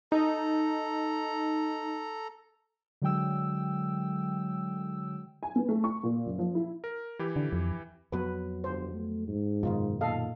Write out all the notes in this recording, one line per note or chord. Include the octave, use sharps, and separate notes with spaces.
D#4 A4 A#5
D3 F#3 G#3 G5 E6
G#5
B3
A3
C#6
A#2
F#1
F3
E4
A#4
E3 E4 G4
D3
F2
F2 F#3 B3 B4
G1 C5
A3
G#2
F#2 B2 D#3 D#4 F4
A#2 A4 D#5 F5